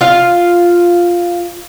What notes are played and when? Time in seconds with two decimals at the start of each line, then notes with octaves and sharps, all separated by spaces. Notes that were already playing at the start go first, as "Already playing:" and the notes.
0.01 F4 F5